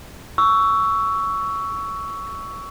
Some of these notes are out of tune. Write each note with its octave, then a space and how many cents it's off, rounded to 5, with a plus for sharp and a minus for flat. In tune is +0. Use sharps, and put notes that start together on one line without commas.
C#6 +15 E6 +0